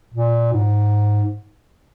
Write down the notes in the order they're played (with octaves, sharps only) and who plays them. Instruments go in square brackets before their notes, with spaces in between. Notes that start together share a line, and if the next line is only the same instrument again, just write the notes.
[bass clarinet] A#2
G#2